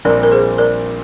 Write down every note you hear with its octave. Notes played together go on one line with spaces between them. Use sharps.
A#1 A#2 G3 C4 A#4 D5
A#4
G#4 C5
A#4 D5